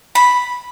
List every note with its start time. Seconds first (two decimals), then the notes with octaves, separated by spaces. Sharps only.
0.15 B5